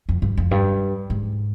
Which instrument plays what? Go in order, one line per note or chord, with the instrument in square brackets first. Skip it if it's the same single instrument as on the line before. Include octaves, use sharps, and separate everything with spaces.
[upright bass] F2
G2
F2
G2
G#2